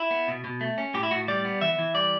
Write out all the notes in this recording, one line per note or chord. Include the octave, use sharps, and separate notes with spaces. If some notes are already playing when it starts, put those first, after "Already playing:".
Already playing: E4
B3
B2
B2
A3
C#4
A2 G4
E4
A2 F#4
G3 D5
B3
E3 E5
E3
G3 D5